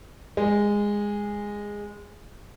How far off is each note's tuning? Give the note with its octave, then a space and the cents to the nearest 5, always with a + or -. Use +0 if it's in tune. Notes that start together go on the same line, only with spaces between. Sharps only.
G#3 -15